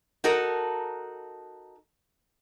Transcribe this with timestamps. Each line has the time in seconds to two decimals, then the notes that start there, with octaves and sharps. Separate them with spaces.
0.24 D#4 F#4 A4 A#4